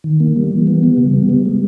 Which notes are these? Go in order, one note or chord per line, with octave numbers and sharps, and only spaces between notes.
D#3
A#3
G3
E3
B3
G3
C#3
B3
G3
G#3